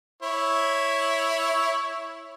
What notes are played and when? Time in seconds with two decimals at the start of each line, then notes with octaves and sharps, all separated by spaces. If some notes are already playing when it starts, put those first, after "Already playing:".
0.23 E4 C#5